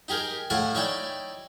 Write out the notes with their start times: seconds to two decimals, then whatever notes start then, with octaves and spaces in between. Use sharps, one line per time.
0.08 D#4 G4 G#4 A#4
0.50 A2 F5 F#5 G#5 A5 D6
0.75 D#4 E4 C#5 D5 G5 A5